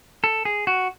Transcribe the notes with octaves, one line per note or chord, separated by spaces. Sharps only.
A4
G#4
F#4